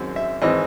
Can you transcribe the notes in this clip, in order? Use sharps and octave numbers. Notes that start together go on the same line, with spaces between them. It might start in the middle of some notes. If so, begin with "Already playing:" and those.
Already playing: G#1 F#2 C4
E5
G#1 E3 C4 D#5